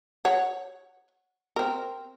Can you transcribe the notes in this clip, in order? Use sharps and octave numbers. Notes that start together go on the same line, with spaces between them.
C#5 F#5
C4 A#4